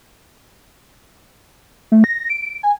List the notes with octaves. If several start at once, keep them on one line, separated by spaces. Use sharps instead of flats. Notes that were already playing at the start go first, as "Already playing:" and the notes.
A3
A#6
D7
G#5